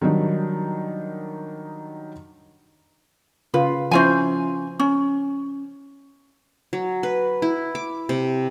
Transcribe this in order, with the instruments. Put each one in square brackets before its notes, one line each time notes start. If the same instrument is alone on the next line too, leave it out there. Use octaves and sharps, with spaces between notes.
[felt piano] D#3 F#3 G3 D4 D#4
[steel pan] C#3 F4 [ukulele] B4
[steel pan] F3 E4 C5 [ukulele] C#4 F4 G#5
[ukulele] C#4
[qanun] F#3
B4
E4
D6
C3